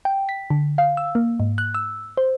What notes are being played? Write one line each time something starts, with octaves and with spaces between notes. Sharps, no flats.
G5
B6
D3
F5
E6
A#3
G#2
F#6
E6
C5